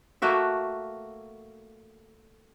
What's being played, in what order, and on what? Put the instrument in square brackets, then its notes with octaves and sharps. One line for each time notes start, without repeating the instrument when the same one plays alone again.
[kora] A3 A#3 F#4 E5